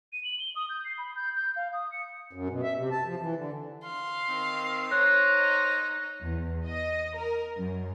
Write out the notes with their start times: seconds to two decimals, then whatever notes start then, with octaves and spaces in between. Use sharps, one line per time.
0.13 D#7
0.24 F#7
0.39 G7
0.55 D#6
0.69 G6
0.85 C7
0.98 B5
1.16 G6
1.36 G6
1.56 F5
1.73 D#6
1.92 C#7
2.33 F#2
2.49 B2
2.63 E5
2.75 C3
2.91 A5
3.06 F3
3.20 E3
3.35 D3
3.85 F5 C6
4.29 D#3 C4
4.91 D#4 A#4 C5 C#5 F#6
5.40 D#5
6.22 E2
6.66 D#5
7.17 A#4
7.56 F#2